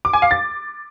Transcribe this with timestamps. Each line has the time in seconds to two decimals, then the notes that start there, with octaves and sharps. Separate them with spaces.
0.05 D6
0.13 G#5
0.22 F5
0.31 A6